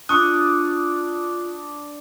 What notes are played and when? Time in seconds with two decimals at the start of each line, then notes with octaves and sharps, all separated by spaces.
0.09 D4 F4 C#6 D#6 F#6